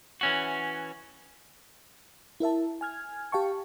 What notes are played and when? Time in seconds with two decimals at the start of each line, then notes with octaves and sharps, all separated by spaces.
0.21 E3 C#4 F#4
2.40 E4 A#4 E5 A5
2.81 G#5 F6 G#6
3.32 G4 F5 G5 A5 C#6